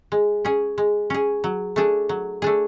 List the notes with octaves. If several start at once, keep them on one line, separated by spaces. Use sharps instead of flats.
G#3
C#4 G#4
G#3
C#4 G#4
F#3
A3 D4 G#4
F#3
A3 D4 G#4